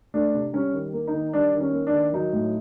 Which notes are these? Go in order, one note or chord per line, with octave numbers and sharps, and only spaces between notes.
A3 D4
C3
G3 C#4
D#3
A#3
D#4
D#3
G3 D4
D#3
C#4
A#3
D4
D#3
F#3 D#4
A2